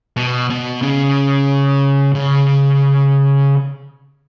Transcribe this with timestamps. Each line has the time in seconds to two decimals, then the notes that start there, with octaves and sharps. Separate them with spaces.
0.17 B2
0.50 B2
0.82 C#3
2.15 C#3